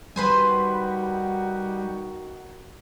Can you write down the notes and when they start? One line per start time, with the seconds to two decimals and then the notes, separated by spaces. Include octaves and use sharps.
0.16 D#3 G3 D#4 F#4 B4 C5 G#5